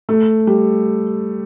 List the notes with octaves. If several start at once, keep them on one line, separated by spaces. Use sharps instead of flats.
A3
G3